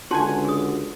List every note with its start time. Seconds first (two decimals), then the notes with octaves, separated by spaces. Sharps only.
0.11 C#2 D3 D4 F#4 G#5 A5 C6
0.45 G#4 D#6